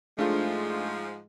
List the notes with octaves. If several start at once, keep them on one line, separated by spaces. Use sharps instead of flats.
G#2 F3 G#3 A3 D4 F4 G#4 F5